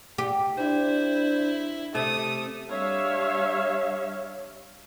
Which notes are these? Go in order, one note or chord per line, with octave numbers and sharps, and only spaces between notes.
G4
D4 E4 C5
C3 A3 D#6
G3 D4 C#5 E5 F5